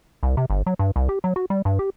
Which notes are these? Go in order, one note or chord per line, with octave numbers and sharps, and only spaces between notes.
C2
C3
G1
F#3
G2
C2
G4
F#3
F#4
G3
G2
G4